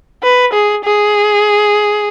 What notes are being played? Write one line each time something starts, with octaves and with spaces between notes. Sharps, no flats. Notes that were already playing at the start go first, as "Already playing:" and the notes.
B4
G#4
G#4